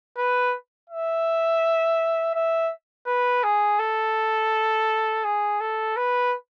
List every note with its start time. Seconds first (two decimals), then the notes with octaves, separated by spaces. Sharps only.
0.17 B4
0.90 E5
2.35 E5
3.07 B4
3.43 G#4
3.79 A4
5.24 G#4
5.60 A4
5.97 B4